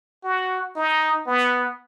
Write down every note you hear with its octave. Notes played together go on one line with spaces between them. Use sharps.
F#4
D#4
B3